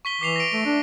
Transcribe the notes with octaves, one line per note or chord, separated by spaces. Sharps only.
C#6 B6 G7
E3 D6 C7 F7
A#6 D7
A3
D4